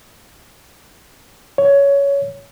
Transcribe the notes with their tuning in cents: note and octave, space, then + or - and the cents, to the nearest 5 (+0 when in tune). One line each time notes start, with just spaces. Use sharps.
C#5 +15